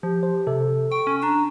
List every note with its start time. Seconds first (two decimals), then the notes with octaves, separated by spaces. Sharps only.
0.03 F3 G4
0.23 C5
0.47 C3 A4
0.92 G5 C#6
1.07 C#4
1.23 D4 A#5